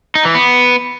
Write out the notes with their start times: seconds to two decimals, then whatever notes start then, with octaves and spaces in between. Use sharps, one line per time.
0.15 D#4
0.25 E3
0.35 B3